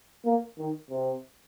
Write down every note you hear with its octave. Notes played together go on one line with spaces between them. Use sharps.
A#3
D#3
C3